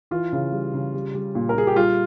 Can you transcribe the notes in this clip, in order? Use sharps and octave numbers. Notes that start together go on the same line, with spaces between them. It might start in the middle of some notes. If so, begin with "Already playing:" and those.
E3 F4
C#3
G3
C#3
G3
G3
A#2
A#4
A#2 G#4
G4
G3 F4